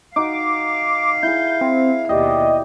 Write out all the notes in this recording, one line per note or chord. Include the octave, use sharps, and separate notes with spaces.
D#4 F#4 F5 D6
E4 G#4 G6
C4
D#2 B2 G4 D5 D#5